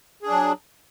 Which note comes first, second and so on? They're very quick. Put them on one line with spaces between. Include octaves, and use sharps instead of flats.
G#4 D4 F#3